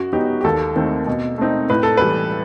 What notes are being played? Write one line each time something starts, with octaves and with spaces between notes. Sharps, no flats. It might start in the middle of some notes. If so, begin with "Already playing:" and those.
Already playing: F#2 F#4
F#3 B3 D#4 G4
G4
D#2 A4
D#3 A3 C4
B2
A3 C4 D#4
A2 B4
A4
E3 G3 B4